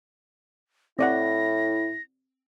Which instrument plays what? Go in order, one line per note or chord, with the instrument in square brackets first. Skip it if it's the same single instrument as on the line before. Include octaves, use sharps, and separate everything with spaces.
[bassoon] A2 [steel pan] C4 D5 F#5 [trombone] E4 [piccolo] A#6